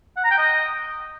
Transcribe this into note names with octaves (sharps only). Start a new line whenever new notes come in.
F#5
A#5
G5
D#5